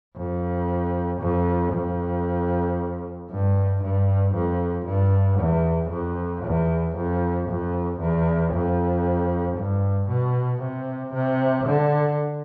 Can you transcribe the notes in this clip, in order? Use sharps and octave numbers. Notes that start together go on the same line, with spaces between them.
F2
F2
F2
G2
G2
F2
G2
E2
F2
E2
F2
F2
E2
F2
G2
B2
C3
C3
D3